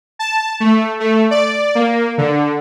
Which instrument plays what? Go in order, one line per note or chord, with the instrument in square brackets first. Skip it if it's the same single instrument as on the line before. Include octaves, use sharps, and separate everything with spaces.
[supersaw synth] A5
A3
A3
D5
A#3
D3